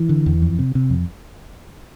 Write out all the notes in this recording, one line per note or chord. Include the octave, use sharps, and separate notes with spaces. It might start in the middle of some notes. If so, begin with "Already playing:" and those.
Already playing: E3
D3
E2
F2
C3
C3
F2